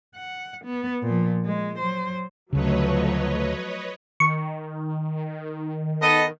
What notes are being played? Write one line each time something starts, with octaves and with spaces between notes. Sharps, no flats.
F#5
B3
A#2 F3
G#3
F#3 C5
D2 C#3 F3 F#3 A3 B4 C#5 D#5
D#3 C#6
B3 A4 D#5